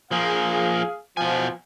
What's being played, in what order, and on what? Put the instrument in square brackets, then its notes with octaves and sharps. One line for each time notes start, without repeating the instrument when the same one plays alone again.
[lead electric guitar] F3 A#3 [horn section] G#4 F5
[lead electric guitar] B2 G#5 [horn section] F3